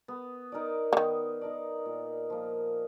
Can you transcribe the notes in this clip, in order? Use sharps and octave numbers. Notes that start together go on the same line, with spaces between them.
B3
D#4 A#4 D5
D3
D#3 B3
D#4 A#4 D5
A#2
F3 A#3